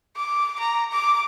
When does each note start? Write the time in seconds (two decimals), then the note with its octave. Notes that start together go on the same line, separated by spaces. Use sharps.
0.17 D6
0.60 A#5
0.92 D6